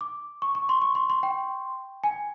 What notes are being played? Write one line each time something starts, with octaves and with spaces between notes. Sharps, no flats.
D6
C#6
C#6
C6
C#6
C6
C6
G5
G#5